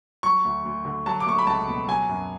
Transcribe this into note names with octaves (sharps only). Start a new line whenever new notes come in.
F#3 C#6
D2
D2
D3
F#3 A5
D6
A3 C#6
B5
C#2 A5
B2
F#3 G#5
F#2